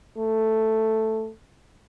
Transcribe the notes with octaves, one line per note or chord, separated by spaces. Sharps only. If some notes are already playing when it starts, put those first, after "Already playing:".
A3